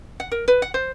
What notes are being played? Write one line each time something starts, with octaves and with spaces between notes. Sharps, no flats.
F#5
A#4
B4
F#5
C5